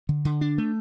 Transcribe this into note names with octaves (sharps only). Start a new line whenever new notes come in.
D3
D3
D4
A3